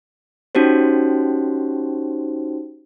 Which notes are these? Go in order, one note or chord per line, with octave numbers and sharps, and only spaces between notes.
C#4 D#4 F#4 G4 C5